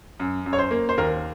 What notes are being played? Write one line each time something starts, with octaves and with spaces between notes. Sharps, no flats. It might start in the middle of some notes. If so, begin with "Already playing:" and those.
F#2
F#2
C#5
C5
A#3
C5
D#2 A#4